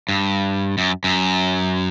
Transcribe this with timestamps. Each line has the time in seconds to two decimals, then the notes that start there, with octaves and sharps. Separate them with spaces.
0.09 G2
0.78 F#2
1.04 F#2